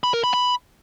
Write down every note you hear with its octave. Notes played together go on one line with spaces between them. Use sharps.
B5
A#4
B5
B5